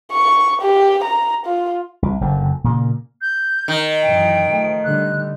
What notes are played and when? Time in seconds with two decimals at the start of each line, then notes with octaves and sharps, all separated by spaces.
0.12 C#6
0.62 G4
1.04 A#5
1.46 F4
2.02 C2
2.21 F#1 F#2 D3
2.64 A#2 C#3 A#3
3.21 G6
3.68 D#3
4.02 F#2 E3 G5
4.47 F3 A3
4.84 D3 G3 F#6